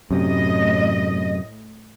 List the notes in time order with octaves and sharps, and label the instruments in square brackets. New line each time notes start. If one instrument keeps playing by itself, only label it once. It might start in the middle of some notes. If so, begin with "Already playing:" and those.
[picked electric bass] F#2 C3 [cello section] A2 D#5